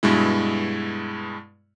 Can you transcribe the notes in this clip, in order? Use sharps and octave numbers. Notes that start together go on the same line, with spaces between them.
G2 B2 G#3 E4